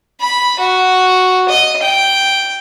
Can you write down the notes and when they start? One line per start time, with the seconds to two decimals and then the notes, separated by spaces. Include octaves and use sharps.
0.21 B5
0.59 F#4
1.49 D#5
1.82 G5